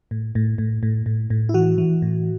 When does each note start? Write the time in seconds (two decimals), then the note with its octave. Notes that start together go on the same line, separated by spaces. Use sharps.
0.11 A2
0.35 A2
0.58 A2
0.83 A2
1.06 A2
1.30 A2
1.49 E4
1.54 E3 F#4
1.78 E3
2.02 A2